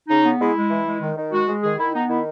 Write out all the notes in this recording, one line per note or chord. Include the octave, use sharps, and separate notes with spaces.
C#3 D#4
B3
G#3 E4
G#3
E3
G#3
D#3
D#3
G#3 F#4
G#3
D#3 G#4
D#3 E4
B3 D#4
D#3 E4